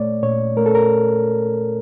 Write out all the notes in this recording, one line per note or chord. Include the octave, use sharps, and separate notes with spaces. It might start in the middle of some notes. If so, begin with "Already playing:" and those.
Already playing: A#2 A3 C#5 D5
A#2 C#5
A3 A#4
A4
A#4